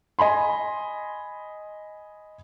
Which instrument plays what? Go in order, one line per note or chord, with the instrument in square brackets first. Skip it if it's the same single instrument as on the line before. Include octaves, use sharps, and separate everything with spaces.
[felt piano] D#5 G#5 B5 C6